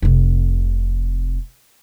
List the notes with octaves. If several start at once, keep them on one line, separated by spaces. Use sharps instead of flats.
F1 C3